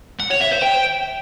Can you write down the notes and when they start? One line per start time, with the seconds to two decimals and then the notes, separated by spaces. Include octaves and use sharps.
0.20 F#5
0.30 C#5
0.41 E5
0.51 C5
0.62 G5